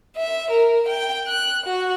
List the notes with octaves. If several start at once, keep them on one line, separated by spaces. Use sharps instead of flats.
E5
A#4
G5
F#6
F#4